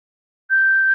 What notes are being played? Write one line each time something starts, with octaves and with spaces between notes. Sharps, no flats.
G6